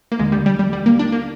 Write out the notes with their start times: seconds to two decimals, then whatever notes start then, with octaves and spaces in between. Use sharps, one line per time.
0.12 A#3
0.19 D#2 D3 G#3
0.32 G3
0.46 G3
0.59 G3
0.73 G3
0.86 A#3
0.99 D4
1.12 A#3